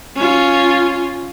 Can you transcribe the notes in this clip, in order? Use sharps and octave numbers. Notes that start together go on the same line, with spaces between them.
C#4 F4